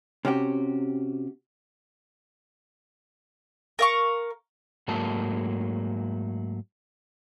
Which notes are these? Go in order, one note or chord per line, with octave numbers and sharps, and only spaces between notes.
C3 C#4 F#4 G4
A#4 F5 C#6
G#2 F#3 A3 A#3 A5